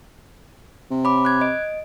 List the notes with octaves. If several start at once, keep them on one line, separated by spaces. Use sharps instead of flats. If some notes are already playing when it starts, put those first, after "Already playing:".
C3
C#5 B5 D6
F#6 G#6
D#5 D7